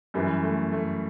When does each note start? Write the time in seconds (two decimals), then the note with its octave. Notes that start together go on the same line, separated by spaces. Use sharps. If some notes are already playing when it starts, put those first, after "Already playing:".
0.14 F#2 E3 G3
0.43 A3
0.72 A3